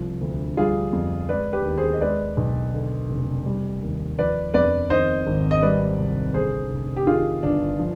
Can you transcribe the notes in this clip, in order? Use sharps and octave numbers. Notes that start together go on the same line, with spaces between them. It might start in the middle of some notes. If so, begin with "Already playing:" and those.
Already playing: C2 F3
D2
G3 F4 G#4
F2
G#3 B4 D5
G4 B4
D#2
G#4 C5
D#5
G#3 B4 D5
B1
D3
F1
G3
D#2
F3 B4 D5
F2 B4 D5
D#3 C5 D#5
G#1
D#5
G3 B4 D5
C2
D3 G#4 C5
F1
G4
D#3 F4 G#4
G1 D4
F3